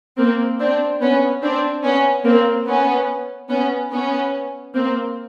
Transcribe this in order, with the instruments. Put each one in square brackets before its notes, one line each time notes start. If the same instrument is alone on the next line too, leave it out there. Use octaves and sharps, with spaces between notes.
[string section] A#3 C4
C4 D4
B3 C#4
C4 D4
B3 C#4
A#3 C4
B3 C#4
B3 C#4
B3 C#4
A#3 C4